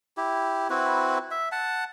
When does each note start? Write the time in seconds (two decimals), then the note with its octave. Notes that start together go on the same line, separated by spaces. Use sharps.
0.17 E4 G4
0.70 C4 E4 F#4 B4
1.31 E5
1.52 F#5 A5